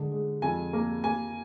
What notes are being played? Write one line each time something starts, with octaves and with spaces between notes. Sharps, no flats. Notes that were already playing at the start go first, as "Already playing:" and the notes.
Already playing: D3 G#3
G#3
F2 G#5
A#3
A#3 G#5